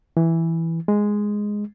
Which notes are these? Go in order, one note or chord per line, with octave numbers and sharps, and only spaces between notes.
E3
G#3